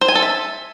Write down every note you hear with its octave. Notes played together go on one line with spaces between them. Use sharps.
C5
G#5
A4
E5